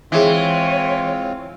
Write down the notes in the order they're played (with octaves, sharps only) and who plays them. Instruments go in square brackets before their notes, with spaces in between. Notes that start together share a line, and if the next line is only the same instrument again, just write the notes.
[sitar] E3 [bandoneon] G#3 C4 F4 [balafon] G#4 E5 [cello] C#5